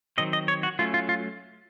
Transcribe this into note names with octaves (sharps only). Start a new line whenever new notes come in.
D#3 F#3 C4 D#5
D#5
C#5
F#4
F#3 A3 C#4 F4
F4
F4